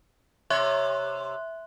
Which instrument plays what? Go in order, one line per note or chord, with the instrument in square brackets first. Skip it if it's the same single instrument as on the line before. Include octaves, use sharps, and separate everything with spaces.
[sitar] C3 C#5 [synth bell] E5 C6 F#6